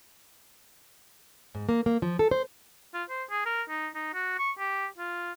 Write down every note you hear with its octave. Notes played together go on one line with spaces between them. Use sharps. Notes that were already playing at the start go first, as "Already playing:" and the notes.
G#2
A#3
A#3
F3
A4
C5
F4
C5
G#4
A#4
D#4
D#4
F#4
C#6
G4
F4